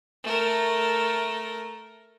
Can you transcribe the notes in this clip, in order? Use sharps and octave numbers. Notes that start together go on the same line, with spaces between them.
A3 A#4